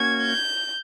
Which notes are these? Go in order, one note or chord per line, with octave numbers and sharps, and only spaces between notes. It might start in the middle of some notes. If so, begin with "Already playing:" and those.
Already playing: A#3 C#4 F#4 G#6
G6